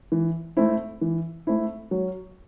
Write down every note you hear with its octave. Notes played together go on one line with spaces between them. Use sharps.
E3
A3 C4 E4
E3
A3 C4 E4
F#3